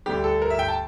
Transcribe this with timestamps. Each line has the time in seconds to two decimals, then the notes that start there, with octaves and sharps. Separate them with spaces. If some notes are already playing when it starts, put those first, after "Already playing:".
0.06 D2 D3 G3 G4
0.24 A4
0.42 A#4
0.50 E5
0.59 G5
0.68 A5